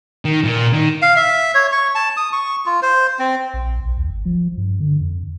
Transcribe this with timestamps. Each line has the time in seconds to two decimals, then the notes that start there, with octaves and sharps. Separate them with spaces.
0.25 D#3
0.44 A#2
0.73 D#3
1.02 F5
1.16 E5
1.54 C#5
1.72 C#6
1.95 A5
2.17 D#6
2.33 C#6
2.66 F4
2.82 C5
3.19 C4
3.54 A#1
3.80 B1
3.97 D#2
4.10 G1
4.25 F3
4.57 G2
4.80 D3
5.00 F2